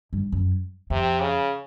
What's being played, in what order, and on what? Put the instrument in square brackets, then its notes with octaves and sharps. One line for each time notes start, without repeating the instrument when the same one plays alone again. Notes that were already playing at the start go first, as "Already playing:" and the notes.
[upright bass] G2
F#2
[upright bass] F2 [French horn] C3
[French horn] C#3